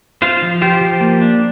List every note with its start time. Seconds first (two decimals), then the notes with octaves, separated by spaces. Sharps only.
0.22 F4 C5 F5
0.42 F3
0.61 F4 G4 C5
0.81 F3
1.00 A#3
1.21 D4